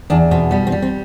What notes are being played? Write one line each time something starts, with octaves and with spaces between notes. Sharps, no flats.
E2 D4
B2 C4
G3 B3
C4
G3
C4